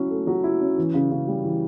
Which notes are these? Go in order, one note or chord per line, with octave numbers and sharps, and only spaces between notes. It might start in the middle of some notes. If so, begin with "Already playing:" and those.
Already playing: F#3 C#4 E4
A3
F#3
E4
C#4
E3
C#3
C#3
G3
E3